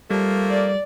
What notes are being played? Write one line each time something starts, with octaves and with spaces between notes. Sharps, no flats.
F3 G3 A3 A#3
D5